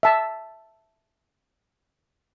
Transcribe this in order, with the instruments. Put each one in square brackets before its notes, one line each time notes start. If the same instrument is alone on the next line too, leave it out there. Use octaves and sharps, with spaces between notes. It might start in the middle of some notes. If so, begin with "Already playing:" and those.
[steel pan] E5 A5